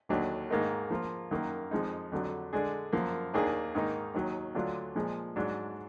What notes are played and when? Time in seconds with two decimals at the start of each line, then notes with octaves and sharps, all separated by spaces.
0.09 D#2 D3 F#3 D4
0.50 G#2 D#3 A#3 D#4 A#4
0.90 F3 A#3 F4
1.31 F#2 D#3 A#3
1.71 F2 F3 G#3 D#4
2.12 F2 D3 F#3
2.53 D3 G#3 D4 G#4
2.92 F#2 F3 A#3
3.34 D#2 D#3 A#3 D4 G#4
3.74 G#2 D#3 A#3 D#4
4.14 D#2 D#3 F#3
4.55 D2 D3 F#3 D4 F4
4.95 A#2 F3 G#3
5.36 G#2 F#3 D4